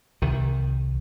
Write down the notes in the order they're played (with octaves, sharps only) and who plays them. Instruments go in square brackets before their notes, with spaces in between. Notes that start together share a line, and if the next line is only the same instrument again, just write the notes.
[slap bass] C2 D#3